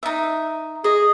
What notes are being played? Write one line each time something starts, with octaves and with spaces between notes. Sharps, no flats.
D#4 E5
G#4 D#5